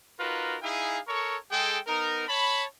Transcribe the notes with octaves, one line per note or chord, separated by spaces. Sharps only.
D#4 F4 F#4 A#4 B4
D#4 E4 G#4 F5 G#5
A4 A#4 C#5 C#6
G#3 G#4 A4 G5
B3 D#4 A#4
C#5 A5 B5